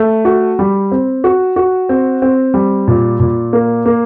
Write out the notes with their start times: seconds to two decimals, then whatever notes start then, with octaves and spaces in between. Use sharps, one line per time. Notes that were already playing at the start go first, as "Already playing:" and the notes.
Already playing: A3
0.25 F#4
0.59 G3
0.92 C4
1.24 F#4
1.56 F#4
1.89 C4
2.22 C4
2.54 G3
2.88 A#2
3.20 A#2
3.53 A#3
3.86 A#3